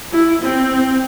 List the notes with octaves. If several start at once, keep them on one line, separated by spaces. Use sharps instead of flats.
E4
C4